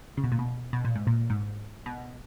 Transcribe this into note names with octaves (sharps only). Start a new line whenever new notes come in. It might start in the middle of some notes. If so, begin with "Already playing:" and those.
C#3
B2
A#2
B2
B2
A#2
G#2
A#2
G#2
B2